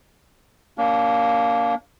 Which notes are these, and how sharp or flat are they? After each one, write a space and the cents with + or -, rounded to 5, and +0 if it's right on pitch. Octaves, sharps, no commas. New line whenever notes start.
A#3 +0 D4 -40